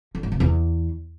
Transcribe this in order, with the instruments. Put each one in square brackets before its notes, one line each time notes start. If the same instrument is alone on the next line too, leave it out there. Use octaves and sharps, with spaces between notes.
[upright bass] D3
G#2
C3
E2